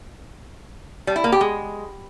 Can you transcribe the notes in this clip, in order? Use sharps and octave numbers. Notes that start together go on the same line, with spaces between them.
G3
E4
A#3
G4
G#3